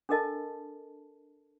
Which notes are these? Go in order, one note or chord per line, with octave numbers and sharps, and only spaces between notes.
D4 A4 A#4 D#5 A5